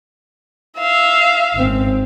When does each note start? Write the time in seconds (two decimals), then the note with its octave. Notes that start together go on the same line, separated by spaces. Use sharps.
0.77 E5 F5
1.57 G#1 C4 C#4